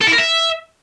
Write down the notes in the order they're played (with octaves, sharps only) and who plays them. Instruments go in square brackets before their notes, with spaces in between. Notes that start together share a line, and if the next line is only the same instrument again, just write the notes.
[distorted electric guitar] A4
E4
A#4
E5